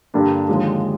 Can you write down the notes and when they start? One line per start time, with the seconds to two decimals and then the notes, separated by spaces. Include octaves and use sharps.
0.14 G2 D3 G3 A#3 D4
0.48 D#2 D3 F3 G#3